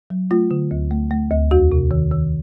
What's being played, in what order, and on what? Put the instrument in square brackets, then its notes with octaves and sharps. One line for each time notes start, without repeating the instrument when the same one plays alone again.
[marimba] F#3
A3 F4
D3
D2
A3
A3
D2
E2 F#4
C3
D#3
D#3